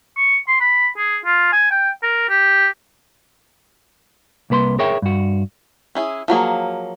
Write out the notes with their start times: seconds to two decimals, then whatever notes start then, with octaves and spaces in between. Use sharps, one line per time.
0.17 C#6
0.48 C6
0.60 B5
0.97 G#4
1.25 F4
1.53 G#5
1.71 G5
2.03 A#4
2.29 G4
4.50 C2 A#3 B4 B5 C6
4.79 G#4 A#4 C#5 E5 G5
5.02 G2 F#4
5.95 C#4 E4 G#4
6.28 F3 F#3 A#3 G#4